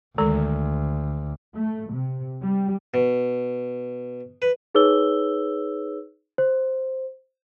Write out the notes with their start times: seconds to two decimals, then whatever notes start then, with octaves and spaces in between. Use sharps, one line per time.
0.18 D2 D#3 G#3 A4
1.56 A3
1.93 C3
2.43 G3
2.94 B2
4.42 B4
4.75 D#4 G#4 B4 C#5 E6 G7
6.38 C5